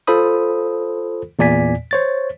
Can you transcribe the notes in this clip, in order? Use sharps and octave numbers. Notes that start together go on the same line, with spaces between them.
F4 A4 C5 B5 D#6
E2 A#2 D5 G#5 B6
C5 C#5 A6